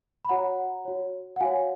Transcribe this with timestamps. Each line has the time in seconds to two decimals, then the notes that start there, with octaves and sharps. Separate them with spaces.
0.25 B5
0.29 F#4 C#5 F#5 A#5
0.85 F#4 C#5
1.36 F#5
1.40 F#4 C#5 F5 G#5